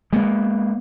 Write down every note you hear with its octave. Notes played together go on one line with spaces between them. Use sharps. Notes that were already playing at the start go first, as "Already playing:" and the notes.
G#3 A#3 B3